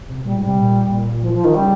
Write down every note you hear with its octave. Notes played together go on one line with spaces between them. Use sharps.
C3
A#2 G3
G#2
G3
C3
A#2
A#2
F3
F3
D#3
C#3 G3